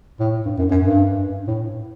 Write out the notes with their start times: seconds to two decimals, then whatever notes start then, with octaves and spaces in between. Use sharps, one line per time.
0.20 A2
0.46 G2
0.59 F#2
0.71 F#2
0.84 G2
1.48 A2